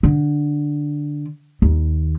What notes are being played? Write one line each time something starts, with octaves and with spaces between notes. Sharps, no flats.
D3
D#2